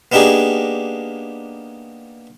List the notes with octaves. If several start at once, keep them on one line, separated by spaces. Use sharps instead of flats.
A#3 B3 D4 D#4 G4 G#4